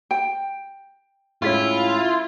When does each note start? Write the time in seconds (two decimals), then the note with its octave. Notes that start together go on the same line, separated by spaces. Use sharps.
0.11 G5
1.42 A2 G#3 C#4 E4 F4